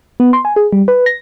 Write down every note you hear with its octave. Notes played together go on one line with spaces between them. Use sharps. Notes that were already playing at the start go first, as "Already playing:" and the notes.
B3
C6
G#5
G#4
G3
B4
A#6